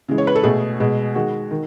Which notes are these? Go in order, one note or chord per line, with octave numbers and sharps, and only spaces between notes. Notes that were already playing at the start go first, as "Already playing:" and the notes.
C#3 E3 G#3
C#5
B4
A4
B2 A3 G#4
B2 G#3
D#3 G#3 F#4
D#3